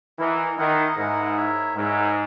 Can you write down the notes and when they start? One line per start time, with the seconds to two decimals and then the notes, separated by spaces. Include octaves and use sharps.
0.19 E3 E4 A#4 D#5 F#5
0.58 D#3 E4 A#4 D#5 F#5
0.97 G#2 E4 A#4 D#5 F#5
1.37 E4 A#4 C#5 E5
1.76 G#2 E4 A#4 C#5 E5